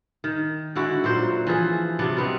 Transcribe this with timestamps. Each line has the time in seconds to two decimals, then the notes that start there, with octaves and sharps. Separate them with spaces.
0.24 D#3
0.76 D3 G#3 E4 F#4
1.04 A#2 F#3 C5
1.47 E3 F3 G#4
1.99 C3 F#3 B3 D4
2.17 B2 B3 C4